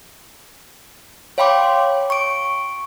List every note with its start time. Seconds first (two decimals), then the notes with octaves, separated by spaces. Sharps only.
1.38 C#5 F5 G5 B5 C6 D6
2.10 C#6 D7